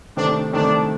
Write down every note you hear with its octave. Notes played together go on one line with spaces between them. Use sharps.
C3 D#3 A3 C4 D4
C3 D#3 A3 C4 D4